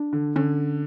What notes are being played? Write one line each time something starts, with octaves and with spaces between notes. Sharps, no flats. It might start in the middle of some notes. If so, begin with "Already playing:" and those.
Already playing: D4
D3
D3 C#4